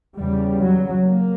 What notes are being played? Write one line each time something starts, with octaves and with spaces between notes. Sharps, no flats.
E2 C#3 G3
F#3
A#3